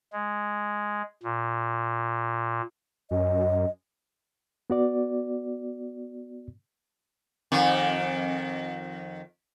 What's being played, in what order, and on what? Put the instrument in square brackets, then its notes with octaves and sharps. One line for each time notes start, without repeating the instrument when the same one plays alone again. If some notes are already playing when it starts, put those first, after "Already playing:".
[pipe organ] G#3
A#2
[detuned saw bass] F#2 [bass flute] D#5
[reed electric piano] B3 F#4 D5
[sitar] F2 D#3